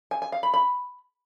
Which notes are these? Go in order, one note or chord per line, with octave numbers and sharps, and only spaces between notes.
G#5
G#5
F5
B5
B5